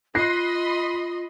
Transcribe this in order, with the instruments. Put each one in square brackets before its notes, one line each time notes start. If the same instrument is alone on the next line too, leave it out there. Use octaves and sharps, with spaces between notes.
[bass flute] F4 [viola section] D#5 B5 C6 [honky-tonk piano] F#6 A#6 C7